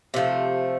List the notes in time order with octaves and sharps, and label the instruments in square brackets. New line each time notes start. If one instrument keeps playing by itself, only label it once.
[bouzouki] C3 F3 A3